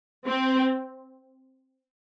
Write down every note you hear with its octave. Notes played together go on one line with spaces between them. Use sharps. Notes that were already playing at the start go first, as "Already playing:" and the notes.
C4